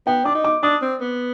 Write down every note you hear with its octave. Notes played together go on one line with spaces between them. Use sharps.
B3 G5
D4 D6
D#4
D6
D4 D#6
C4
B3